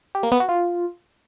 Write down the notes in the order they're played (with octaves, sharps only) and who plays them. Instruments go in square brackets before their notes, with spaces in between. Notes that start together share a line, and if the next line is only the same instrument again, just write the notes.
[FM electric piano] G4
A#3
B3
F#4
F4